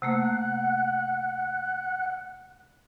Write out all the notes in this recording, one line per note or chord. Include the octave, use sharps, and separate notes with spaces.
C3 A3 A#3 F#5